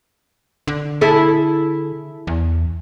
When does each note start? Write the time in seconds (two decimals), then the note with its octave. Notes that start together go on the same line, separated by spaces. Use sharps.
0.67 D3
1.01 E4 G#4 A4
2.27 E2